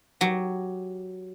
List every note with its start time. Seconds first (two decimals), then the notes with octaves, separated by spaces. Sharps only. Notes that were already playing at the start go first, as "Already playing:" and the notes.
0.21 F#3 G4